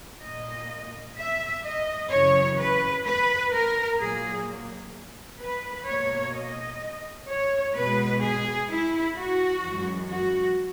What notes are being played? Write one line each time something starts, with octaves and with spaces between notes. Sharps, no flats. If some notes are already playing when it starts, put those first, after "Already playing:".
A#2 A#3 D#5
E5
D#5
F#2 C#3 E3 C#5
B4
B4
A#4
A#2 F#3 A#3 G#4
B4
B2 A#3 C#5
D#5
C#5
B2 G#3 B4
G#4
E4
F#4
F#2 E3 G#3
F#4